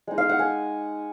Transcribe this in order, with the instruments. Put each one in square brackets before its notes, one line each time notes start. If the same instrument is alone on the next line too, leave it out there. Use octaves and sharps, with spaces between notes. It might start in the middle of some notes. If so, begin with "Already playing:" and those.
[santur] G#3 D#4
F5
F#5
G#5